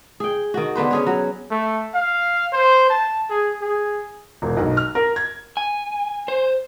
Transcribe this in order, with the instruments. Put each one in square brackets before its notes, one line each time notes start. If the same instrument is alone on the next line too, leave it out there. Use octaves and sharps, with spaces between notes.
[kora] G#4 G5
D#3 F#4
D3 B3 B4 C5
C#4 G#4 C#5
F#3
[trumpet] A3
F5
C5
A5
G#4
G#4
[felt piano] E1
B1
F6
A#4
G#6
[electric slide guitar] G#5
C5